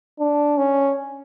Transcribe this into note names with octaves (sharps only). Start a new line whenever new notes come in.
D4
C#4